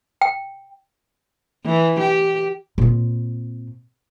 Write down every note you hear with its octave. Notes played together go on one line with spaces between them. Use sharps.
G5
E3
G4
A#2 C4